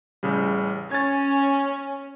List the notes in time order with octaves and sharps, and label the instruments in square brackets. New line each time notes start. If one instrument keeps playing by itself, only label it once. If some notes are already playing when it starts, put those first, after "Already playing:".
[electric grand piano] A1 C#3 G3
[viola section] C#4 [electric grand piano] G#6 A6